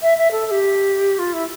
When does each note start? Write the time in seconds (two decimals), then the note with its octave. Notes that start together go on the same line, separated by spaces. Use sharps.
0.02 E5
0.17 E5
0.31 A4
0.46 A4
0.51 G4
1.19 F4
1.33 E4